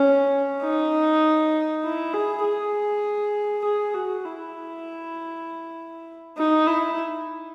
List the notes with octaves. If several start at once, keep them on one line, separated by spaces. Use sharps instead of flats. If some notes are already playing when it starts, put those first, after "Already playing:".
Already playing: C#4
D#4
E4
G#4
G#4
G#4
F#4
E4
D#4
E4